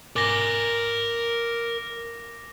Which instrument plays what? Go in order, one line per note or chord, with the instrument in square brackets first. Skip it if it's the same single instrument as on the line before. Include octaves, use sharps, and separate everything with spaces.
[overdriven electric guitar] A#4 G#5 [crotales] D6 A#6